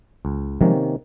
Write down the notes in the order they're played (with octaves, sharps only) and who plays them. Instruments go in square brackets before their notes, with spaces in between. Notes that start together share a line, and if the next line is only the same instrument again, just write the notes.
[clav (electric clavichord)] C#2
[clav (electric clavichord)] C3 D#3 A#3 C#4 [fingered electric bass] F3 G#3